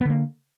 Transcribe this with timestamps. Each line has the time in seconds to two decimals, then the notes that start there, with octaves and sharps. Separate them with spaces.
0.01 B3
0.05 D3
0.10 A#3